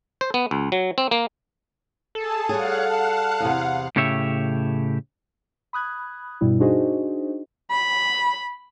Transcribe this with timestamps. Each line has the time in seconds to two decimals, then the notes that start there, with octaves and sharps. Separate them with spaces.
0.21 C5
0.34 B3
0.51 C#2
0.72 F#3
0.98 C4
1.11 A#3
2.15 G#4 A4 A5
2.49 G3 G#4 C#5 F5 F#5
2.88 A5
3.40 E2 C3
3.96 A2 C#3 G4 C#5 E5
5.73 B5 D#6 F#6 G#6
6.41 G2 B2 G3 E4
6.60 D4 D#4 F#4 G#4 C5 D#5
7.71 B5